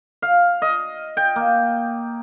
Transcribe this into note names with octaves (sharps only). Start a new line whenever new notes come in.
F5
D#5
G5
A#3